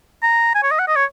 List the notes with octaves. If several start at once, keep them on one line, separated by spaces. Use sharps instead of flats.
A#5
G#5
C#5
D#5
F#5
D#5
C#5